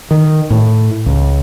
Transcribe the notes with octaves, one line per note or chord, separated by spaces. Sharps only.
D#3
A2
C#2